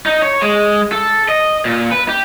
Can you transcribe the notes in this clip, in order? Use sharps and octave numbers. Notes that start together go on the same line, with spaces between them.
D#4
C#5
G#3
A4
D#5
A#2
B4
G4